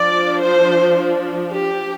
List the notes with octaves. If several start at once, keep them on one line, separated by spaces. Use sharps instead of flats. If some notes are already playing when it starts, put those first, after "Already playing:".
Already playing: F3 D4 D5
C5
G4